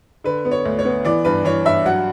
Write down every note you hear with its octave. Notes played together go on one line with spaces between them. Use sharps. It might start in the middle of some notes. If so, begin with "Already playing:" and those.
D3 B4
B3
C#5
D2
C#5
B3
E3 D5
G2 B4
E3 C#5
G2 E5
F#3 F#5